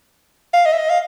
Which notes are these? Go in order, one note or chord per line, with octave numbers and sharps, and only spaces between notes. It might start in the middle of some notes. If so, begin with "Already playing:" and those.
F5
D#5
E5
D#5
F5